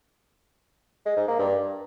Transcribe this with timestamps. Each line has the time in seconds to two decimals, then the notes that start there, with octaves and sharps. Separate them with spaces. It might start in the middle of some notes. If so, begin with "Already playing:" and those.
1.06 G#3
1.17 G#2
1.28 A#3
1.39 G2